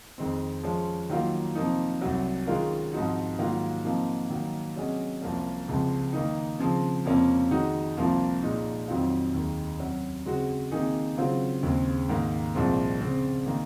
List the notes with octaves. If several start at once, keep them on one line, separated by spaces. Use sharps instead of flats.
F2 D#3 G#3 C4
F3 G#3 C#4
D#3 F#3 A#3 F4
C3 F3 A#3 D#4
C2 C3 F#3
D#3 G#3 C#4 F4 A#4
G#2 F3 C4 D#4 F#4
G#2 D#3 F#3 A#3 F4
C3 F3 A#3 D#4
D#3 F#3 A#3
C3 F#3 C#4 G#4 D#5
C2 C3 F3 A#3 C#4
C#2 C3 F3 G#3
D#3 A#3 D#4
C#3 F3 C4
F2 C3 F3 A#3 C#4
D#3 G#3 D#4 F#4
C2 C3 F3 A#3 F4
A#2 G#3 D#4
F2 D#3 F#3 C4 F4
D#2 D#3 G#3
C3 F#3 C#4 F#4
C#3 G#3 C4 F#4 C5
C3 D#3 A#3 D#4 G#4
C#3 F#3 C4 F4 C5
D#2 C#3 G#3 C4
G#2 D#3 A#3
C2 A#2 F3 G#3 C4
C#3 G#3 C4
D#3 A#3